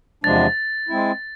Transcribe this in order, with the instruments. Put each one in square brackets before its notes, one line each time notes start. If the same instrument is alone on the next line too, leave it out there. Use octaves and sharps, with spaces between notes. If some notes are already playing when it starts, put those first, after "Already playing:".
[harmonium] E2 C3 F3 G#3 D4 [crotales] A6
[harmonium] G#3 C4 E4